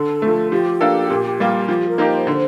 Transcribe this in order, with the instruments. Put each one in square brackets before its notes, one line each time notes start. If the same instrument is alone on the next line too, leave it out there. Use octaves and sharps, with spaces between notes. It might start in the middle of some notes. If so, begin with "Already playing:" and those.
Already playing: [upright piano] D3 [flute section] A4
[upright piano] F3 A3
[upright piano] F3 [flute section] G4
[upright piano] A#3 D4 F4 A4
A#2
G3 A#3 F4
[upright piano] F3 [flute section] G4
[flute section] A#4
[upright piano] A#3 D#4 G4
[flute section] C5
[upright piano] D3